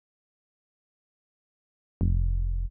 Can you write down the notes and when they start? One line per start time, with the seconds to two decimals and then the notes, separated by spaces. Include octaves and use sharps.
2.01 F1